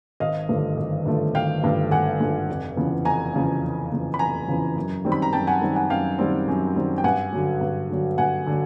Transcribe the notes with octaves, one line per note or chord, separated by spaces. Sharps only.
G#1 D#5 F5
G2 D3 F3 A3
G#1
G2 D3 F3 A3
G#1 F5 G5
G2 D3 F3 A3
G#1 F#5 G#5
G2 D3 F3 A3
F1
E2 C#3 F3
F1 G#5 A#5
E2 C#3 F3
F1
E2 C#3 F3
B5
F1 G#5 A#5
E2 C#3 F3
F#2
D#3 G3 C4
B5
A#5
F#2 G5 A5
F#5 G#5
D#3 G3 C4
F#5 G#5
F#2 F5 G5
D#3 G3 C4
F#2
D#3 G3 C4
G5
G2 F#5 G#5
D3 F#3
G2
D3 F#3
G2 F#5 G#5
D3 F#3